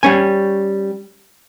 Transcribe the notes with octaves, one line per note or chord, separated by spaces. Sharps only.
G3 C#4 G#5